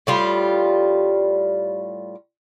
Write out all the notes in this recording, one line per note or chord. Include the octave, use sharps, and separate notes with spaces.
A2 G3 F4